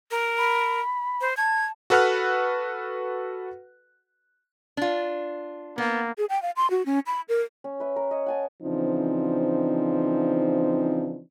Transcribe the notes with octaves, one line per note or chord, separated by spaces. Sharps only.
A#4
B5
C5
A5 G#6
F#4 A4 B4 F#5 F6 F#6
D4 F4
A#3 B3
G#4
G5
F5
C6
F#4
C#4
B5
A#4
C#4
B4 E5
A#4
C#5 D#5
F#5 G#5 A5
C#3 E3 F3 C4 D4 D#4